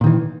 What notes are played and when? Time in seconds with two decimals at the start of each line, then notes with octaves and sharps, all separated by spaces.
0.01 A#2
0.04 D#3
0.06 E3